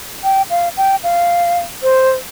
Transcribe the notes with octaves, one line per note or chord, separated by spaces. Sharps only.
G5
F5
G5
F5
C5